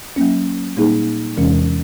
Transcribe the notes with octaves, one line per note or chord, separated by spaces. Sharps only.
F#3 A#3 C#4
A#2 G3 A#3 D#4 G#4
E2 C3 E3 G#3 C#4